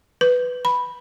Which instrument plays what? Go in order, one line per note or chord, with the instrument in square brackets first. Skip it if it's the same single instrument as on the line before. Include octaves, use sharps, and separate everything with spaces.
[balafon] B4
B5